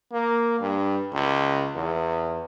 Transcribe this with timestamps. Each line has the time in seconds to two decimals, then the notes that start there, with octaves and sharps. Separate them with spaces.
0.13 A#3
0.60 G2
1.13 C#2
1.76 E2